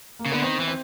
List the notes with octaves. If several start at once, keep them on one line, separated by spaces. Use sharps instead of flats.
A#3
C#3
D3 B3
D#3 C4
E3
C4